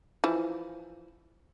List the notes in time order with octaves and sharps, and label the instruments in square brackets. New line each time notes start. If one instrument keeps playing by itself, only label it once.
[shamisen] E3 F3